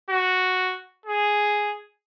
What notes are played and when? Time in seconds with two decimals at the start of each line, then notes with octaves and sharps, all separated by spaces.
0.10 F#4
1.06 G#4